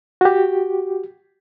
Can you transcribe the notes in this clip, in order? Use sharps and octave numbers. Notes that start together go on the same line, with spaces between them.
F#4 G4